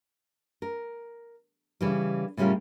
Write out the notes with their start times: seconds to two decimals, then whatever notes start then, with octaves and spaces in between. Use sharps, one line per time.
0.62 A#4
1.81 C#3 E3 G3
2.37 A2 C#3 G3 C#4 F4 A#4